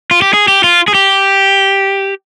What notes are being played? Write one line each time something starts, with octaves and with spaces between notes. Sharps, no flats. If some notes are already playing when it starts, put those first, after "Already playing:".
F4
G4
G#4
G4
F4
G#4
G4